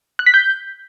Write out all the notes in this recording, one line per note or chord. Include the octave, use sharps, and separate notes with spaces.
F#6
B6
G6